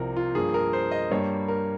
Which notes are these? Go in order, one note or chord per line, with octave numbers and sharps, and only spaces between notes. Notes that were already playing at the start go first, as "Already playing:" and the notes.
Already playing: C2 C3 F3 A#4
F4
G2 F3 A#3 G#4
A#4
C5
D#5
G2 G3 A#3 C#5
A#4